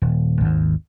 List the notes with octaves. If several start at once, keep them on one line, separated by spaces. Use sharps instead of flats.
D#1
G#1 D#2